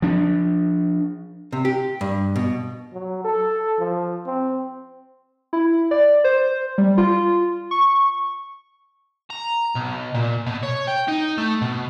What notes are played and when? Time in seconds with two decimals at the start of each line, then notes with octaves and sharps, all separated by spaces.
0.02 F3 D4
1.52 C3
1.65 G4
2.01 G2
2.36 B2
2.93 F#3
3.24 A4
3.79 F3
4.26 C4
5.53 E4
5.91 D5
6.24 C5
6.78 G3
6.98 F4
7.71 C#6
9.30 A#5
9.75 B1
10.14 A#2
10.46 B2
10.63 C#5
10.87 G5
11.08 D#4
11.38 A3
11.62 B2